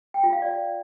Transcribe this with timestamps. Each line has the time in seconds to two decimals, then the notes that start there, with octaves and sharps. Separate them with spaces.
0.14 G5
0.23 F4
0.33 F5
0.42 D5